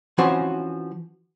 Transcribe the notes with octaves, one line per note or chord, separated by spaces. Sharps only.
E3 F3 C4 C#4 F#4 C5